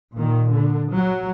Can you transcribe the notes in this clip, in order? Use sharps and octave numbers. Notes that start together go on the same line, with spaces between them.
A#2 D#3
D3
F#3